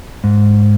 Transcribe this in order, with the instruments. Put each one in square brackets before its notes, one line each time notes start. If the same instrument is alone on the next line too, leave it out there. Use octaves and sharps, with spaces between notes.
[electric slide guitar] G#2